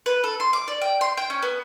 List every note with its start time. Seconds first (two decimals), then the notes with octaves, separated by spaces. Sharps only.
0.06 B4
0.24 A4
0.40 C6
0.53 D6
0.68 D5
0.81 G5
1.01 C6
1.17 G5
1.30 C#4
1.43 B3